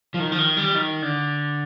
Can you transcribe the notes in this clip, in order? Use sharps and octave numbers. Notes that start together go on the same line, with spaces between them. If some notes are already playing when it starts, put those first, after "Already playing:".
F3
D#3
F3
D#3
G3
D#3
D3